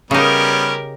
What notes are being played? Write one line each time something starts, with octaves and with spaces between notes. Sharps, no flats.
C#3 G3 B3 C#4 D#4 G4 A#4